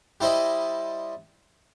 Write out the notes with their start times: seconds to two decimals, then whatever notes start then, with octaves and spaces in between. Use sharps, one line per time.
0.21 G3 E4 C5 D5 D#5